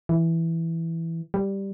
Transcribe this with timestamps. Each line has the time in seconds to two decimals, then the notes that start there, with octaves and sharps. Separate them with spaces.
0.09 E3
1.34 G3